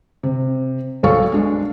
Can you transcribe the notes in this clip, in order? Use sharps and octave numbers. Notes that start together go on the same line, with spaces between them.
C3
B1 A4 F5 C#6
G#3 D4